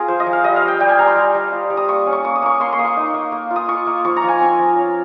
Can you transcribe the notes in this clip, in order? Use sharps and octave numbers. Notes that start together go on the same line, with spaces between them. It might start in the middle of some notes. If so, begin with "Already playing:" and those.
Already playing: C4 F4 G#4 A#4
F3 C5
D#5
F3
F5
G3 D#5
F5
G3
G5
G3 G5
G#5
G3 A#5
C6
G3
G3
F4
G3
D#6
A#3 C#6
C#4
C#6
A#3 C#6
D#6
A#3 C#6
A#3 C6
C6
A#3 D#6
C#6
D#4
A#3
A#3
F4
D#6
F4 C#6
A#3
F3 C#6
A#5
F3
G#5
C4
F3
C#4